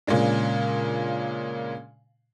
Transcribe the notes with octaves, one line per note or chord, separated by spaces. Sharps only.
A#2 C#3 G#3 D4